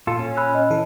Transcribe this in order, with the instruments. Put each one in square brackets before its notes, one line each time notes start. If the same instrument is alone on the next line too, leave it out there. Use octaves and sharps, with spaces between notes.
[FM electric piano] A#2 [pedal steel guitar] F4 A4
[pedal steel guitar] C#4
[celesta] B5 E6 F#6
D#5
[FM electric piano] E3 A4